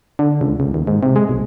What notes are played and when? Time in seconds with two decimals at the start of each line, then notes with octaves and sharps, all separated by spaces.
0.19 D3
0.41 C#2
0.60 C#2
0.74 D#2
0.87 G#2
1.03 C3
1.16 G#3
1.29 B1